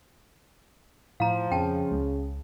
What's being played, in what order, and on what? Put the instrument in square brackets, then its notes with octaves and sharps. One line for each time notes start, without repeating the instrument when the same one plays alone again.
[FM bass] A2 [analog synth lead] F3 [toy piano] F5 A#5
[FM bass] F2 [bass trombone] C#3 [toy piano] G5 A5
[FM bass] C#2